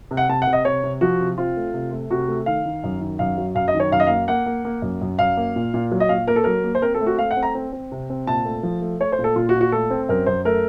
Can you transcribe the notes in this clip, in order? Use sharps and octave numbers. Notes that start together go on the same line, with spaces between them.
C3
F#5
C3 A5
F#5
C3
D#5
C3 C#5
C3
F3 F#4
C3
C4 F4
A3
C3
A3
C3 F#4
A3
D#3 F5
D#3
F#2
D#3
F#2 F5
F#3
F#2 F5
D#5
D#3
C#5
F#2 F5
D#5
A#3 F5
A#3 F#5
A#3
A#3
F#2
F#2
F#2 F5
A#3
A#2
A#2
F#3
D#5
A#2 F5
A#3 A#4
A4
F#3 A#4
A#3
C5
C4 A#4
A4
A3
F#4
A3 F5
F#5
C4
A#5
C4
C4
C3
C4
A#2 A5
A3
F3
A3
A3 C#5
C5
A#2
A4
A#2 F4
F#4
A#2
F#4
A3 A4
C4
F#2 A#4
F#2 C5
A3 A#4